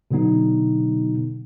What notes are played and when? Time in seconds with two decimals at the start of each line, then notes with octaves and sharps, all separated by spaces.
0.11 B2 D3 F#3 B3 D#4